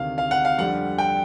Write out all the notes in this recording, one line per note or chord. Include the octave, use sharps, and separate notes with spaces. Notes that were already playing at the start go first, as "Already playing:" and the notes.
Already playing: D2 C3 D#3 F5
F5
F#5
F5
F2 D3 G3 F#5
G5